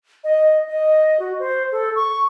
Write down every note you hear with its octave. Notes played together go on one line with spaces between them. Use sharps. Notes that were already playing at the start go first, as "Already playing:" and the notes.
D#5
D#5
F#4
C5
A4
C#6